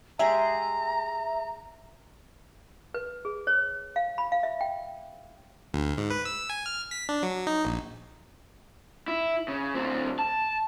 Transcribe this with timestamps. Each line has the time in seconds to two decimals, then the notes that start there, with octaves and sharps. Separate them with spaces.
0.19 G#3 G4 G#4 E5 A#5
2.94 B4
3.25 G#4
3.47 C#5
3.96 F5
4.18 B5
4.32 F5
4.43 E5
4.61 G5
5.74 D2
5.98 G#2
6.10 B4
6.25 E6
6.50 G#5
6.66 F6
6.91 B6
7.09 D4
7.23 F#3
7.47 D#4
7.65 A#1
9.08 E4
9.48 C#3
9.75 D2 C4
10.19 A5